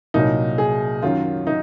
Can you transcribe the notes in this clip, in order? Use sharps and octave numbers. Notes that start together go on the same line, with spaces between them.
C2 A#2 F#3 D#4
G#4
F#2 D#3 F#3 F4
D#4